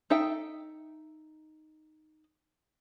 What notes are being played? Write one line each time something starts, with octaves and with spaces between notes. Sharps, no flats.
D#4 A4 E5 G5